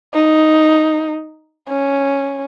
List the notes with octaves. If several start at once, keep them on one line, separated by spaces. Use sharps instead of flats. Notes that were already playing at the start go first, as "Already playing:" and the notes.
D#4
C#4